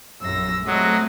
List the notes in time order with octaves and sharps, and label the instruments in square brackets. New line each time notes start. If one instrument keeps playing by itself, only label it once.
[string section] A#1 F#2 [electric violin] E6 A#6
[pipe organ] F#3 [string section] G#3 A3 C4 [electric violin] D#6 A#6